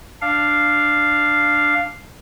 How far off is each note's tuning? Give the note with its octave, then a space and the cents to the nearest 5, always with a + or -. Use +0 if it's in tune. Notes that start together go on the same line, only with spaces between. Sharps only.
D4 +0 F5 -5